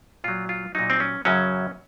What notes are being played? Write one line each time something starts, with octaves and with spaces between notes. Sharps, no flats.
A#2 F#3 F4
F4
A#2 F#3 D#4
C4
C#4
F#2 C#3 F#3 C#4